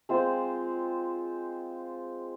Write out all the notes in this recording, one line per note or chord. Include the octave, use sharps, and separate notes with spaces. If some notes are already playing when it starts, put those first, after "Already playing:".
G#3 C4 F4 C5